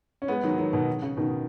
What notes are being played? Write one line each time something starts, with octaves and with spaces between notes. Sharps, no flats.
C#4
G#3 B3
D#3 F#3
D#3 F#3
B2 D#3
C#3
B2 D#3